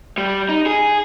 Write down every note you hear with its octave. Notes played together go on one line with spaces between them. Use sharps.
G3
D#4
G#4